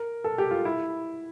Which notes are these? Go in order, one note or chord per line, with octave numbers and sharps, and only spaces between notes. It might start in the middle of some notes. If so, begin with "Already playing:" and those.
Already playing: A#4
A4
G4
F4
E4